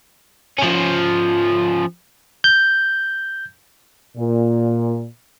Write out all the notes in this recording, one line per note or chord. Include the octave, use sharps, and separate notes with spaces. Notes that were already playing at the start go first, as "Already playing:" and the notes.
F3 C#4
G6
A#2